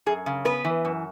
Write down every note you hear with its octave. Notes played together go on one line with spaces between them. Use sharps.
F#2 G#4
C#3
B3 B4
E3
F#2